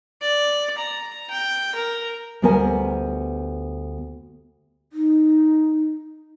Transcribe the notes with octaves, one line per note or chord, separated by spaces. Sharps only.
D5
A#5
G5
A#4
D2 G3 B3 A#4 C5 G#5
D#4